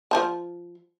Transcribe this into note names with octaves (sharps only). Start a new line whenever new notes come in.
F3 C5 A5